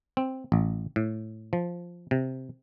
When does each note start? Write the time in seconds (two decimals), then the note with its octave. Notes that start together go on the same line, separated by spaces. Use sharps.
0.17 C4
0.52 A1
0.96 A2
1.53 F3
2.11 C3